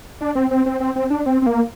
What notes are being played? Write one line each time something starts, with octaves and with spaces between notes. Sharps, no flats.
D4
C4
C4
C4
C4
C4
D4
C4
C4
A#3